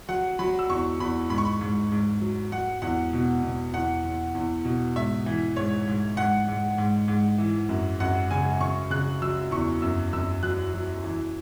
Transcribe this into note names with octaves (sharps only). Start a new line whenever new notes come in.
F#3 F#5
F#3 B5
E6
E2 C#6
E2 B5
G#2 B5
C#6
B5
G#2
G#2
F#3
F#3 F#5
E2 F#5
B2
B2
E2 F#5
E2
E2
B2
G#2 E5
E3
G#2 C#5
G#2
G#2 F#5
G#2
G#2
G#2
E3
F#2
F#2 F#5
C#3 G#5
C#3 C#6
C#3 F#6
F#3 E6
E2 C#6
F#2 E6
F#2 E6
F#3 F#6
F#3
E3